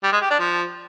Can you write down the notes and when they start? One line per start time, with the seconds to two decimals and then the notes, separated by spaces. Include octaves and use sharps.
0.03 G3
0.12 G#3
0.21 G4
0.30 D4
0.39 F3